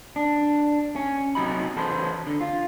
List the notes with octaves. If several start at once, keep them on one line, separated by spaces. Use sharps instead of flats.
D4
C#4
B1 C3 F#3 D#4 B5
E2 A4 B4 C5
D3
F4